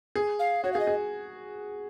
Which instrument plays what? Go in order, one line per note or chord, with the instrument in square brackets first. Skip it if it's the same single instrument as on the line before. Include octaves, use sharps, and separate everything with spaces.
[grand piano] G#4
[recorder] F5
[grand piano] F#4 [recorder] C#5
[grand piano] G#4 [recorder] F5
[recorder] D#5
[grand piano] G#4